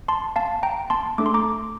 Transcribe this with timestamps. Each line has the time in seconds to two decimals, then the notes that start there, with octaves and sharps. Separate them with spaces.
0.08 A5 C6
0.36 F5 A5
0.63 G5 A#5
0.90 A5 C6
1.18 A3 D4 A4 D6
1.26 C6
1.34 A#5 D6